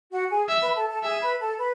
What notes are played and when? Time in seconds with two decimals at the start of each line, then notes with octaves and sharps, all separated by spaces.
0.12 F#4 F#5
0.30 G#4 G#5
0.49 E5
0.62 B4 B5
0.76 A4 A5
0.90 A4 A5
1.03 G#4 E5 G#5
1.22 B4 B5
1.40 A4 A5
1.59 B4 B5